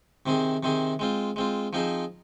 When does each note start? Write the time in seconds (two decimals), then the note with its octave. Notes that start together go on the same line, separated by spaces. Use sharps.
0.26 C3 D#3 C4 G#4
0.63 C3 D#3 C4 G#4
0.99 G#3 C4 F4
1.36 G#3 C4 F4
1.73 F3 C4 D#4 G#4